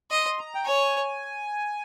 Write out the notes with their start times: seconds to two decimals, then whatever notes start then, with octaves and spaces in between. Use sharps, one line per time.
0.11 D#5 C6
0.39 A#5
0.55 G5
0.65 C#5 G#5